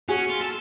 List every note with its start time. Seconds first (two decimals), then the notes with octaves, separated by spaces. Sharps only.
0.08 C#4 F#4 G#4
0.29 F4
0.41 A4